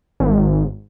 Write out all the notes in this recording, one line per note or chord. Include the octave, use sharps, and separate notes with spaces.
G#1